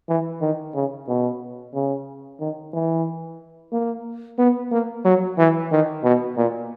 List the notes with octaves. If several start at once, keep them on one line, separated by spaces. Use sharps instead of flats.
E3
D#3
C#3
B2
C#3
D#3
E3
A#3
B3
A#3
F#3
E3
D#3
B2
A#2